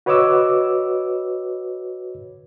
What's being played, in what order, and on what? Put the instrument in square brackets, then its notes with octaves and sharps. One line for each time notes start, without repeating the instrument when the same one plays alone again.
[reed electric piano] F#4 B4 C#5 D#5 D6 E6